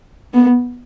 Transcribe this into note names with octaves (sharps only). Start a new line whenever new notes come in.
B3